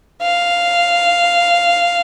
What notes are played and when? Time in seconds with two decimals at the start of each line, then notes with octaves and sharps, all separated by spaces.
0.22 F5